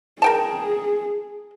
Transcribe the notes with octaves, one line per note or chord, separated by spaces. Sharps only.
G#4 A#4 G5 A5